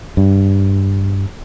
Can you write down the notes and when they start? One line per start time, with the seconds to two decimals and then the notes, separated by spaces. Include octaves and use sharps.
0.17 G2